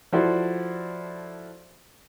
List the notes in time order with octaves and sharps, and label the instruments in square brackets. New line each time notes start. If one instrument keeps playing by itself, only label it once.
[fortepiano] F3 E4 F#4 A4 C5 D5